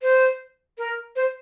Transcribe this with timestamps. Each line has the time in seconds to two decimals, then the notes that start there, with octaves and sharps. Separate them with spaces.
0.02 C5
0.78 A#4
1.16 C5